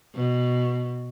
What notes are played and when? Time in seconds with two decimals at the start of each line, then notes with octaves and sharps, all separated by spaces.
0.15 B2